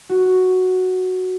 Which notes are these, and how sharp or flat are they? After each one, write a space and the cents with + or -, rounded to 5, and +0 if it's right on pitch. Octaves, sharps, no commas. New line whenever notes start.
F#4 +0